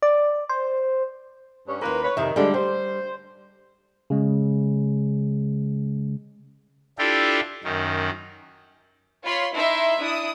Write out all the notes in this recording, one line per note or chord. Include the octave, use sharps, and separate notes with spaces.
D5
C5
G2 C#4
D#2 A#3 C#4 F4 B4
B4 C#5
F2 C3 D#3 E5
D3 G3 G#3 D4
G3 C5
C#3 G#3
D4 E4 F4 G4 A4
F#2 D#3
F4 C#5 B5 C6 B6
D#4 E4 E5 C6
D4 E4 D#6